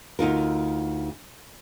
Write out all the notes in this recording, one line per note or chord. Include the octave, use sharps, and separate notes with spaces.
D2 D#4 F4 A#4